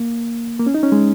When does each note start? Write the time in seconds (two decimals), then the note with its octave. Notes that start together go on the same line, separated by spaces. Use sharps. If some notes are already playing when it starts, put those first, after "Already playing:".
Already playing: A#3
0.60 A#3
0.66 C#4
0.74 D#4
0.83 C#4
0.92 G#3